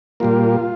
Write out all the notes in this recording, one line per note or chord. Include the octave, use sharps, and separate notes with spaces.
A#2 G3 A#3 F4